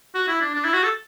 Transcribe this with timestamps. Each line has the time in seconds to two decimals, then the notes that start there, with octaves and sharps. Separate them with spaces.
0.15 F#4
0.28 E4
0.41 D4
0.54 D4
0.65 E4
0.74 F#4
0.84 A4